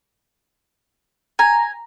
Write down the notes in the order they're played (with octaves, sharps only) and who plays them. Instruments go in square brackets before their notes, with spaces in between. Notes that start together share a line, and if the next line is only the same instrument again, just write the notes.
[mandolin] G#5 [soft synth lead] A#5